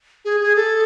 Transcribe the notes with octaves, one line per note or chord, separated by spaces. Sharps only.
G#4
G#4
A4